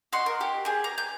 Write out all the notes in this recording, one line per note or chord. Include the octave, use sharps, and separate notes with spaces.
F#4 D#5 C6
A#4
G4
G4 G#4
A#5
G6